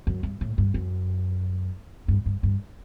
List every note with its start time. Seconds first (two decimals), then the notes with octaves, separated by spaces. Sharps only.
0.07 F#2
0.23 G2
0.41 A2
0.58 G2
0.74 F#2
2.08 G2
2.26 G2
2.43 G2